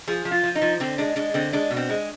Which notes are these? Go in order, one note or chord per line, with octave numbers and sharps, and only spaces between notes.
F3 G#4
F3
F4
F3
D#4
F3
D3 C4
G#3 D4
G#3 D4
D3 C4
G#3 D4
B2
C4
G#3